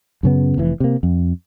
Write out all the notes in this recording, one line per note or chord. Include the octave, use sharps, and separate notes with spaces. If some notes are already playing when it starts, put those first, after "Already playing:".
F#2 C#3 B3
F1 E3
C3 A#3
F2